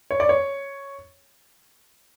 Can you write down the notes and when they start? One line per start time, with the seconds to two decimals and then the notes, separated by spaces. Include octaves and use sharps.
0.11 C#5
0.20 D5
0.29 C#5